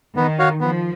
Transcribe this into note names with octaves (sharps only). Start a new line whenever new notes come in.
D#3 B3
F#4 C#5 F5
F3 B3